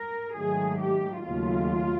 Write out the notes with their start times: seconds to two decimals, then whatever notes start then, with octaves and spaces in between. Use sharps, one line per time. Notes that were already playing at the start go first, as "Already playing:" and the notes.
Already playing: A#4
0.35 G#2 D#3 F#3 A3 G#4
0.80 G4
1.25 D#2 C#3 F#3 A3 F4